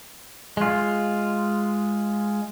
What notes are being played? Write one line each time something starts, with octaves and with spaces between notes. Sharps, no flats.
G#3 F4